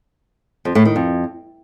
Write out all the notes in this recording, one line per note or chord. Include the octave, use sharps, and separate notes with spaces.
F2
A2
D#3
F2